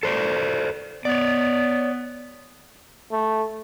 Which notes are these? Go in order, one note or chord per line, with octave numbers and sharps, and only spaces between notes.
A4 C5 D5
B3 C#5 D5
A3